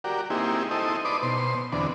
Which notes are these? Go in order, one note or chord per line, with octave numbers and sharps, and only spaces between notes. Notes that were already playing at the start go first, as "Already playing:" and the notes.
F#4 G4 A#4 D5
A#3 C4 D#4 E4 G4 G#4
D#4 E4 A4 C5 D#5
D#4 B4 D5 C6 D6 D#6
B2 C5 C6
E2 D3 B3 C4 D4